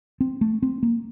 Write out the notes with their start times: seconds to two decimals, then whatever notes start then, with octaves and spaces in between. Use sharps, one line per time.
0.21 C4
0.41 A3
0.63 C4
0.83 A#3